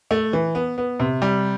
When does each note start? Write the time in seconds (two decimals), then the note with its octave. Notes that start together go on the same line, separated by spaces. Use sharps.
0.11 A3
0.33 E3
0.55 B3
0.78 B3
1.00 C3
1.22 G3